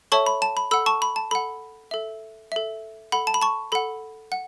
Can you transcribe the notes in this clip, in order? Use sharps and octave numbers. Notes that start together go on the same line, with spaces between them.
A4 C#5 E5 A5 C#6
B5
A5
B5
A4 F#5 B5 E6
A5 C#6
B5
A5
A4 F#5 B5
A4 E5
A4 E5
A4 F#5 B5
A5
B5
A5 C#6
A4 F#5 B5
F#5